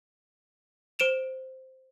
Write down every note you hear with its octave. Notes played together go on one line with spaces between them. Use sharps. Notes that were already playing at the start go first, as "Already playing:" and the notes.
C5 D7 E7 F7